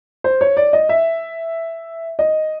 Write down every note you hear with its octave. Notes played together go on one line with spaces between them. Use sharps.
C5
C#5
D5
D#5
E5
D#5